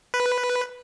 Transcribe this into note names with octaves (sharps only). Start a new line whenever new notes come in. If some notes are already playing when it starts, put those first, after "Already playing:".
B4